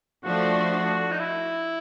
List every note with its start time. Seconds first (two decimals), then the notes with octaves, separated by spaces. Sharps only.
0.24 F3 A3 D4 F#4
0.71 F#4
1.12 D#4
1.19 E4